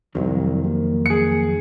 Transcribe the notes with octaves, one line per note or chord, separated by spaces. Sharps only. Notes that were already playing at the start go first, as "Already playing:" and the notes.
C2 F2 D#3 F#3
A#3
G#4 C#7